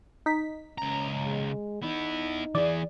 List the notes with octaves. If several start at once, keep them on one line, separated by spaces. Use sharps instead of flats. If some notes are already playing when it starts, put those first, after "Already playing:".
D#4 B6
C#2 C#4 A#5
G#3
B3 D#4 E4
E3 G#4 D5